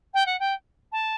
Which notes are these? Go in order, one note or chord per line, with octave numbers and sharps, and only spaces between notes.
G5
F#5
G5
A5